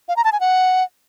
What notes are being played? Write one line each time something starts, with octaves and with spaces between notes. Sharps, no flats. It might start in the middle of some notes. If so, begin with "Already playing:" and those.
F5
A#5
A5
G#5
F#5